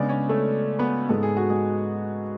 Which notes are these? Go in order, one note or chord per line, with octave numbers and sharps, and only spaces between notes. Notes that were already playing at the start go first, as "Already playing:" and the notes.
Already playing: C#3 G#3 B3 D4 D5
C#4 C#5
A3 A4
B3 B4
G#2 G#3 B3 A4
G#4
F#4
G#3 G#4